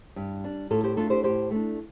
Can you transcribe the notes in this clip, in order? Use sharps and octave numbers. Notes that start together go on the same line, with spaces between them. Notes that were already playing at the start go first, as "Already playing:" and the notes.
G2
G3 D4
A2 F4 A4
G4 C5
A3 D4 F4 A4
G4 C5
A2 G4 C5
A3 D4